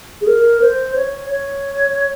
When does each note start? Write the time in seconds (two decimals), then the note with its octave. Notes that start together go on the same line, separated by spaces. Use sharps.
0.21 G#4
0.27 A#4
0.61 C5
0.96 C#5
1.30 C#5